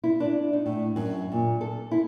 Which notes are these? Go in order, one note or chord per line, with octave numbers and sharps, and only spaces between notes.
E4
D4
D#4
A2
F#2
A#2
A4
E4